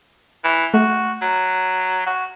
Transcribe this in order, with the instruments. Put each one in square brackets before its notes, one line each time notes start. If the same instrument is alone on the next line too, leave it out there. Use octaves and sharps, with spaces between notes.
[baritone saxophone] E3
[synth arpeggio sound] A3 [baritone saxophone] F#4
[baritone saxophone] F#3
F#4